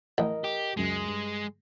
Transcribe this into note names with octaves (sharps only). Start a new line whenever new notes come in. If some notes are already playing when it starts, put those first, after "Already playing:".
A1 A#4 D#5
G4
C#2 F#2 G#3
G2